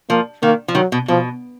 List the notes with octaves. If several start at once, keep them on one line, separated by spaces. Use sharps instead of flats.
F3 A#3
D#3 A#3
F3
D#3 F#3
B2
B2 F3